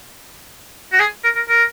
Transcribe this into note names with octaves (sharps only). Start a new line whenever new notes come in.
F#4
G#4
A#4
A#4
A#4